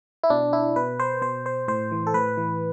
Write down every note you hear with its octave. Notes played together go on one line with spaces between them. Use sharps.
E4
B2 D4
E4
B2 B4
C5
B2 C5
C5
A2 C5
E3
A4
A2 B4
E3